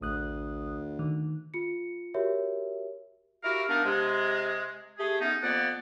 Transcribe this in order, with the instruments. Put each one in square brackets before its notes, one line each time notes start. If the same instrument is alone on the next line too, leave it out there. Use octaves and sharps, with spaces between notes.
[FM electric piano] A1 D#6 F#6 [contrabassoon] D2
[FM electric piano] D#3
[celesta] F4 C#7
F#4 G4 A#4 C#5 E5
[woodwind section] E4 F#4 G4 A#4 F5
A#3 B3 D4 D#4 A#4
C3 G#3
A3 G4 G#4
A3 B3 C#4 D#4
F2 A#3 B3 D5 F#5